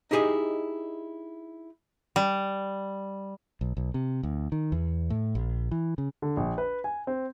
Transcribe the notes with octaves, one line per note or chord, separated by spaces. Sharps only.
D#4 E4 G4 G#4 D5 D#5
G3
B1
B1
C3
D2
D#3
E2
A2
A#1
E3
C#3
D3
A#1
B4
G#5
C4